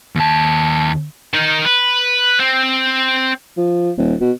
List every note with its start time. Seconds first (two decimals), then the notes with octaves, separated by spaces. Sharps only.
0.16 D#2 A5
1.34 D#3 D#4
1.65 B4
2.39 C4
3.57 F3
3.98 D#1
4.21 B2